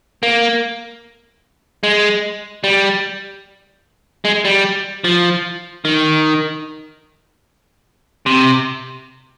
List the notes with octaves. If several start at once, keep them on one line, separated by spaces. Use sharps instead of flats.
A#3
G#3
G3
G#3
G3
F3
D#3
C3